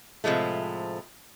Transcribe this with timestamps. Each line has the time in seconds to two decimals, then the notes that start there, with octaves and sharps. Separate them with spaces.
0.24 A2 C3 F3 G#3 A3